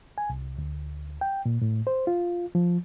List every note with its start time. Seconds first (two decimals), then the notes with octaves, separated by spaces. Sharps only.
0.18 G#5
0.30 C2
0.58 D2
1.21 G5
1.45 A#2
1.62 A2
1.87 C5
2.07 F4
2.55 F3